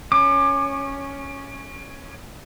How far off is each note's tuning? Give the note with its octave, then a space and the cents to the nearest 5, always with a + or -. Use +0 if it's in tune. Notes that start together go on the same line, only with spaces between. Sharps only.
C#4 +0 D6 +35